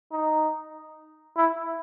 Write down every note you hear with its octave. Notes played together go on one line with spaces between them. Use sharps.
D#4
E4